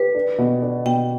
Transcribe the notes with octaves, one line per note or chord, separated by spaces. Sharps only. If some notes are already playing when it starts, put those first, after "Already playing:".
Already playing: G4 B4
D4
B2
D4
B2 G5